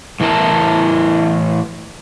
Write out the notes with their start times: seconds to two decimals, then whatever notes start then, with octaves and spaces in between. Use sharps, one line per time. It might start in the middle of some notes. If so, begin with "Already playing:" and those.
0.20 A2 E3 E4 A#4 A5